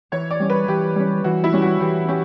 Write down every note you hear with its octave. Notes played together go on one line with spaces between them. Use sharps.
E3 C#5
D5
G3 C#4
B4
E3 G4
G3 C#4
E3 F#4
E4
G3 C#4
F#4
E3 G4
C#4 G4